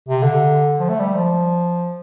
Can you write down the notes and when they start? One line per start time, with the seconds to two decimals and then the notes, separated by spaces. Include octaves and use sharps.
0.08 C3
0.23 D3
0.80 F3
0.89 A3
1.00 G3
1.15 F3